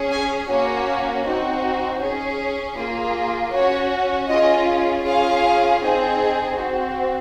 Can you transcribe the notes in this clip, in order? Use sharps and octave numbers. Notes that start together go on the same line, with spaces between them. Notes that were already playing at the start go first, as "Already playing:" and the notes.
Already playing: C#4 G#4
G#5
A#3 C#4 F#4 C#5
C4 D#4 F#4
C#4 G#4
A#3 F4 G#4
C#4 F#4 C#5
C#4 F4 G#4 D#5
C#4 F4 G#4 F5
C4 D#4 G#4
C4 F#4